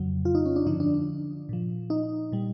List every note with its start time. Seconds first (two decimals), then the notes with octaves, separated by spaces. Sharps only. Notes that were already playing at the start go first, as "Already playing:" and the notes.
Already playing: F2 C#3 F#3
0.25 F4
0.35 D#4
0.45 C#4
0.56 D4
0.66 G2 D3 F3 D#4
0.80 D4
0.94 D4
1.49 A#2 F3
1.90 D#4
2.32 A#2 G3